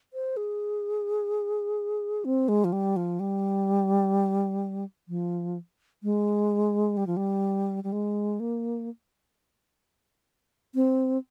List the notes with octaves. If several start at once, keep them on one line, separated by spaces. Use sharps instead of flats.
C5
G#4
C4
G#3
F3
G3
F3
G3
F3
G#3
G3
F3
G3
G3
G#3
A#3
C4